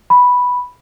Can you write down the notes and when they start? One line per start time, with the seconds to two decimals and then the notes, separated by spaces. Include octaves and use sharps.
0.10 B5